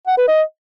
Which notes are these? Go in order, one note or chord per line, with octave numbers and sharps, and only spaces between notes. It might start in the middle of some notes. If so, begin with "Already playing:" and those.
F#5
B4
D#5